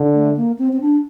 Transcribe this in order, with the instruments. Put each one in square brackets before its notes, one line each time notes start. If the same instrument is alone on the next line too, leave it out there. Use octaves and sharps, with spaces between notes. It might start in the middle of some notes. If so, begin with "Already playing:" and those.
Already playing: [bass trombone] D3
[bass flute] A3
A#3
C4
C4
D4